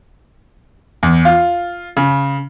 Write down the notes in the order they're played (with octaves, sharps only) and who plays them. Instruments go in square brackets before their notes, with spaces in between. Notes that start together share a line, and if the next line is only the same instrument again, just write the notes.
[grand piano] E2
F4
C#3